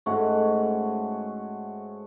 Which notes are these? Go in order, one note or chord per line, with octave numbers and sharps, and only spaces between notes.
G#2 A3 C#4 F#4